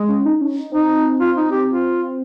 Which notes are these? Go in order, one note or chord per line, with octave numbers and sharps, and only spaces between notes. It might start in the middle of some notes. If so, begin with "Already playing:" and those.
Already playing: G#3
C#4
D#4
C#4
D#4
C4 D#4
F4
D#4
G4
F4